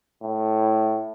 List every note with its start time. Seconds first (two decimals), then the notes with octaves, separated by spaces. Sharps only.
0.23 A2